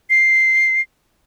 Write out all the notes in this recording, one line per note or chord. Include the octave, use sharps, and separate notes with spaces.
C7